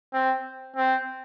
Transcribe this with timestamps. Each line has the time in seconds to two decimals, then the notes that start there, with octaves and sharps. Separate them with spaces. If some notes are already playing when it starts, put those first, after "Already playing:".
0.13 C4
0.76 C4